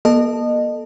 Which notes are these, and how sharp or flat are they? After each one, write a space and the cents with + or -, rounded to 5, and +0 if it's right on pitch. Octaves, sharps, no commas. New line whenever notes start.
A#3 +45 A4 +0 D#5 -25